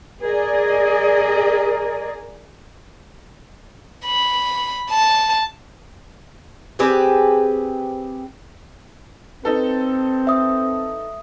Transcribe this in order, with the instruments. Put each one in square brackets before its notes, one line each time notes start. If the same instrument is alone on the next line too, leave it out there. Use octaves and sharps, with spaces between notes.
[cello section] G#4 D5 D#5 [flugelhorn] A#4
[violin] B5
A5
[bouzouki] C4 G4 G#4 B4
[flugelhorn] C4 [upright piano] D#4 A4 B4
[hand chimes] E5 D#6